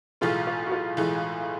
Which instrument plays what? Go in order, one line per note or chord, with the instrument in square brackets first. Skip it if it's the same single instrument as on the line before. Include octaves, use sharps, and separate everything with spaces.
[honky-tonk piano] B1 A2 E3 G#3 [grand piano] F4
[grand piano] F4
F#4
F4
[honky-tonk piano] B1 A2 E3 G#3